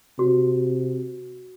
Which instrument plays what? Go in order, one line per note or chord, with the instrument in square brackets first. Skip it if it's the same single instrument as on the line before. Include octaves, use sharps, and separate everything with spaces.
[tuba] C3 [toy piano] F#4